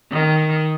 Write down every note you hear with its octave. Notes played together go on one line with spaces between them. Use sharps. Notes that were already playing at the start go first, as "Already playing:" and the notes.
D#3